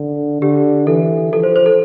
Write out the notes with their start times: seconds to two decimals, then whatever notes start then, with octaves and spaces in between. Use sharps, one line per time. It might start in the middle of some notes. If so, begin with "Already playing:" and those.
Already playing: D3
0.41 D3 G4
0.87 E3 A4
1.32 F3 A4
1.43 C5
1.56 C5
1.66 A4